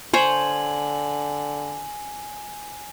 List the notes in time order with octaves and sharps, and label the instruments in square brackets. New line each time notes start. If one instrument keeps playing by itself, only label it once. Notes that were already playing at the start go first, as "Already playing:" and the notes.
[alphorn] D3 [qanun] C5 C#5 [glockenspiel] G#5 F#7